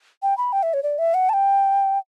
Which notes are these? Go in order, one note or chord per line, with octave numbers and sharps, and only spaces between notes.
G5
B5
G5
E5
C#5
D5
E5
F#5
A5
G5